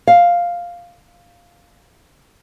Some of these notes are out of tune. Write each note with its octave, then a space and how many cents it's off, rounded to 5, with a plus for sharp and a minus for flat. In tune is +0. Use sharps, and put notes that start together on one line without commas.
F5 +0